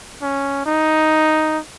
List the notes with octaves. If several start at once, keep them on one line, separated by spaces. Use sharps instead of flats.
C#4
D#4